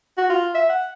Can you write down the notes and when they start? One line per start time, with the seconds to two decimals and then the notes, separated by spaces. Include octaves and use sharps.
0.17 F#4
0.30 F4
0.55 E5
0.69 F#5